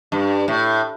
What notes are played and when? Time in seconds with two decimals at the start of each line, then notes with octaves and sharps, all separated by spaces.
0.12 G2
0.48 A2